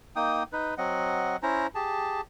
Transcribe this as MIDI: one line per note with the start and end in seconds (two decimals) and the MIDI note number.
0.16 0.43 58
0.16 0.43 63
0.16 0.43 79
0.16 0.43 87
0.52 0.74 63
0.52 0.74 71
0.78 1.37 54
0.78 1.37 60
0.78 1.37 75
0.78 1.37 78
1.43 1.67 61
1.43 1.67 64
1.43 1.67 72
1.43 1.67 82
1.75 2.21 67
1.75 2.21 68
1.75 2.21 81